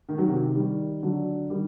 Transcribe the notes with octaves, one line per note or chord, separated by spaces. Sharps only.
D#3
F#3
C3 D#3
D#3 G3
D3 F#3
D#3 G3